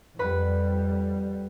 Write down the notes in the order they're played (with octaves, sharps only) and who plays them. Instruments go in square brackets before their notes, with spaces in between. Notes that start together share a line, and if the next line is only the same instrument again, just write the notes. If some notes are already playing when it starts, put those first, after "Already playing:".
[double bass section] F2 G3 [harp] B4 F#5 B5